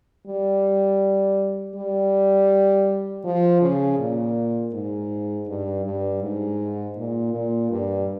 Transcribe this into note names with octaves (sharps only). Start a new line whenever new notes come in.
G3
G3
F3
C#3
A#2
G#2
G2
G2
G#2
A#2
A#2
G2